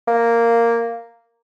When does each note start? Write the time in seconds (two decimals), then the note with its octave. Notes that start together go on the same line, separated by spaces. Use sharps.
0.07 A#3